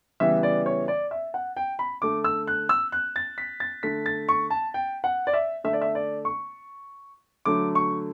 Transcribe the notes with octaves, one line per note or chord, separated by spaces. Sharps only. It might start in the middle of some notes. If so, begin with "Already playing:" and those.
C#3 E3 G3 B3 E5
D5
C#5
D5
E5
F#5
G5
B5
D3 A3 D6
E6
F#6
E6
F#6
A6
B6
A6
D3 A3 B6
A6
C#6
A5
G5
F#5
D5
E5
D3 A3 E5
D5
E5
D5
C#6
D3 F#3 A3 D6
C#6